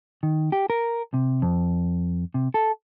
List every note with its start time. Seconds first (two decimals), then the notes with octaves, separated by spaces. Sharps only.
0.23 D#3
0.52 G4
0.70 A#4
1.14 C3
1.42 F2
2.34 C3
2.54 A4